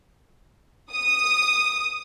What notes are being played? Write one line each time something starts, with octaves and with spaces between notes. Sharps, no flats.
D#6